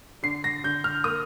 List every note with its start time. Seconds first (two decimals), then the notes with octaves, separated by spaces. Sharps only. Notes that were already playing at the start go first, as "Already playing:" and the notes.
0.23 D3 C7
0.44 A#6
0.64 D3 G6
0.84 F6
1.04 A#3 D#6